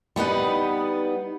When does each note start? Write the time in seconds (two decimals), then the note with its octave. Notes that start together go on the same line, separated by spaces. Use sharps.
0.16 G3 B3 D#4 F#5